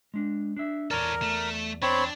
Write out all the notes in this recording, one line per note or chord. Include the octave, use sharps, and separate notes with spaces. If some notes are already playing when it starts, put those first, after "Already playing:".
G#3 D4
D4 E5
E2 A4 A#4 C#5 D5
A3
C4 D4 C#5 B5